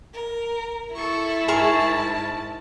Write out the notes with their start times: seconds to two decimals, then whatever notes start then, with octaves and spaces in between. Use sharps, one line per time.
0.14 A#4
0.95 E4 A4 C#6
1.48 G#2 G#4 A#4 A5 C#6